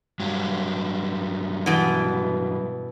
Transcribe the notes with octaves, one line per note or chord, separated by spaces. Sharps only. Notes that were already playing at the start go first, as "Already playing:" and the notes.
G2 F#3
B2 E3